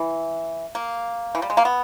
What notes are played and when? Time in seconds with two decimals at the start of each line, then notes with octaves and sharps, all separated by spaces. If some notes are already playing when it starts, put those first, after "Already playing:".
Already playing: E3
0.75 A#3
1.35 E3
1.42 G3
1.50 G#3
1.57 A#3
1.65 B3